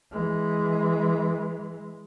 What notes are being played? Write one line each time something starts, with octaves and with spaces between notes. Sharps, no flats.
E3 G#3